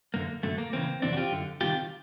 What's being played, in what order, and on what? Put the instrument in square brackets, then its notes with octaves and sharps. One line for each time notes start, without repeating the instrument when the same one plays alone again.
[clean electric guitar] F#2 D3 A#3
F#2 D3 A3
A#3
E2 C#3 E3 A#3 C4
F2 C3 E3 C4 D4
F#4
F4 G4
F#2 D3
C2 C3 D#3 F4 G4